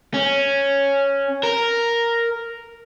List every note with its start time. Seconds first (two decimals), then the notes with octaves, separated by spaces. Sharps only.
0.14 C#4
1.43 A#4